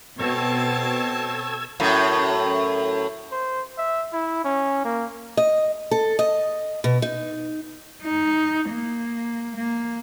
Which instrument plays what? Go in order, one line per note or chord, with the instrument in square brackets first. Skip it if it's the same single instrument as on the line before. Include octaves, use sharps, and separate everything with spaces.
[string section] B2 [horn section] C4 C#5 A5 [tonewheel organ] A4 E6 G#6
[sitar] F#2 A2
[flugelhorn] C5
E5
E4
C#4
A#3
[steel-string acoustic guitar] D#5
A4
D#5
B2
D#4
[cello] D#4
A#3
A#3